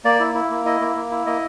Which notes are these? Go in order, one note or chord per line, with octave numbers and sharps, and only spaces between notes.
A#3 D5
E4
E4
A#3
E4 D#5
A#3
A#3
E4
A#3 D#5